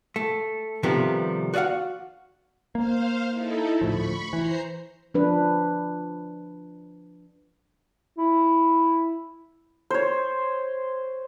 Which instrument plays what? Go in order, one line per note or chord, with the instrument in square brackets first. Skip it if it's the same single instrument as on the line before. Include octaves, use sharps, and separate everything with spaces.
[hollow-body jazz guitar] A3
C3 D#3 F3 G3 A3 B3
F#4 D5 D#5 F5 F#5
[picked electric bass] A#3 [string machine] C5 F5
[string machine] D#4 E4 A4
[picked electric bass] D2 A2 F3 [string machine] B5 C#6
[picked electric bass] E3 [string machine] C5 A#5 C7
[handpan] F3 D4 B4
[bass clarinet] E4
[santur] C5 C#5